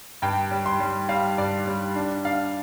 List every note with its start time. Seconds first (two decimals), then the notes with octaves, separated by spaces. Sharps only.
0.22 G2 G5
0.51 G3
0.66 C6
0.80 G3
1.09 G3 F5
1.38 G2 D5
1.67 G3
1.96 D4
2.25 D4 F5